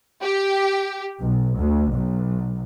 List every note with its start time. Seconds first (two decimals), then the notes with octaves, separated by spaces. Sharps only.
0.22 G4
1.20 B1
1.57 D2
1.91 B1